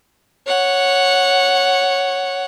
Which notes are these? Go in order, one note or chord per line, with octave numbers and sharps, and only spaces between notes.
C#5 F#5